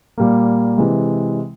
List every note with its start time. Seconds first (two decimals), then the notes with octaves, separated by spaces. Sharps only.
0.18 A#2 G3 A#3
0.78 C3 E3 G#3